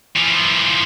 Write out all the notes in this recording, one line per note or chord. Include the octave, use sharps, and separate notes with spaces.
E3 F3